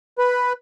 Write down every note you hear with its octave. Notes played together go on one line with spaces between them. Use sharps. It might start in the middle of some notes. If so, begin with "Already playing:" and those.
B4